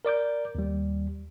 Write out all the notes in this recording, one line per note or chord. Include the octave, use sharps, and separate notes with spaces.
A#4 D5 D6 G6
D#2 G3